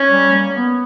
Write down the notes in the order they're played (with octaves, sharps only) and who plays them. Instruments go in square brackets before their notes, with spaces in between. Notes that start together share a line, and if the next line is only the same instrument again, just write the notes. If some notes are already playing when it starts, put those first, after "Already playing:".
Already playing: [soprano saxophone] C#4
[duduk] G3
A#3
B3